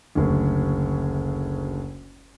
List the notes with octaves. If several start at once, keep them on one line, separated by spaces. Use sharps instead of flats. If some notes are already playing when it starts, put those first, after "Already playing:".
F#1 D2